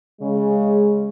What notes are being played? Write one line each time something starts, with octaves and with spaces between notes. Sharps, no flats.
C#3 G#3